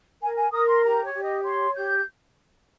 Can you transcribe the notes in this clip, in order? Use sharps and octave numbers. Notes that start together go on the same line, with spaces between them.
A#4 G#5
G#5
A#4 D#6
C6
G4 A#5
C#5
G4
D#5
C#5 C6
G4 G6